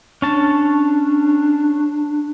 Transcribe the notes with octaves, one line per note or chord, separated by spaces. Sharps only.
C#4 D4 A5